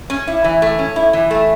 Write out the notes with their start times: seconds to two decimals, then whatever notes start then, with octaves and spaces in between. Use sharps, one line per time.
0.10 C#4
0.27 E4
0.44 E3
0.62 A3
0.79 C#4
0.96 E4
1.13 E3
1.31 A3